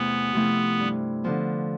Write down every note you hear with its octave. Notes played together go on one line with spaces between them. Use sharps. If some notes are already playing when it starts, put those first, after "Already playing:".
Already playing: E2 C3 A3 B3 E4
C3 F3 A3 E4
G2
D3 F3 B3